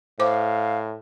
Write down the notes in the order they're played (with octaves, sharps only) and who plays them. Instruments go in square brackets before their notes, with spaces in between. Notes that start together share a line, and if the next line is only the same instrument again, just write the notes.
[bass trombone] A2 [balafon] C5 D6 [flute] F5